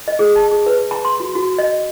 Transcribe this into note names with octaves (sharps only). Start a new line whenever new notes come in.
D#5
G#4
A5
G#4
B4
A#5
C6
F#4
F#4
D#5